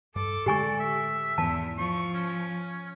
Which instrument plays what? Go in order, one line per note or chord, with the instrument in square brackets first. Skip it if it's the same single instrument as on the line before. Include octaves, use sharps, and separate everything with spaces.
[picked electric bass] G2 [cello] A4 [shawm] D6
[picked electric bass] A2 D3 G#3 [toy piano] G4 G#5 C#6 [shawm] D5
[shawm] E5
[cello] E2 [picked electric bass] G#2 E3 [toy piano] A5
[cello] F3 [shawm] C#6
[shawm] C#4